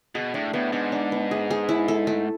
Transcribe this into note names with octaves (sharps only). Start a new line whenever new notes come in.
B2 G#4
A2 D4
A2 B3
G#2 D4
D4
B3
G#4
G#4
E4
A4
A3